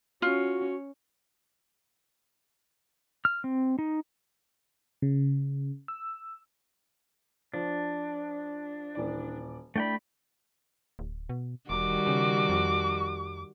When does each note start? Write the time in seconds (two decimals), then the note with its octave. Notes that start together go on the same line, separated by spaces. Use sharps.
0.22 C#4 F4 F#4
3.25 F6
3.44 C4
3.79 D#4
5.02 C#3
5.88 E6
7.54 F3 D4
8.95 D#1 E3 D5
9.76 A3 D4 E4 D5 G5 B5
10.99 D1
11.29 B2
11.70 E1 D#3 G3 F#4 D6
12.07 C#3
12.49 F2